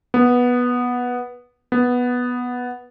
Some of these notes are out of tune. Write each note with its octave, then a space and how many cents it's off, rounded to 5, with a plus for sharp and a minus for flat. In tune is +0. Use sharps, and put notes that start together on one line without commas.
B3 -10
B3 -5